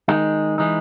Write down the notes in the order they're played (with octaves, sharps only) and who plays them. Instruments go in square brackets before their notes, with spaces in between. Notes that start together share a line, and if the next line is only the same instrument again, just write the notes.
[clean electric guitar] D#3 G#3 D#4
E3 G#3 D#4